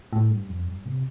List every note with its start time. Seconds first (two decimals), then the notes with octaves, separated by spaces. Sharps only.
0.13 A2
0.31 G2
0.49 F2
0.67 G2
0.85 C3